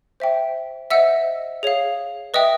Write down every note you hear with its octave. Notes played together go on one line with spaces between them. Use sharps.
C5 E5 G5
C5 D#5 E5 F#5 E6
G#4 C#5 F5
B4 D#5 E5 G5 D#6